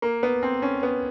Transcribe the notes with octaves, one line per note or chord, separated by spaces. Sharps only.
A#3
B3
C4
C#4
B3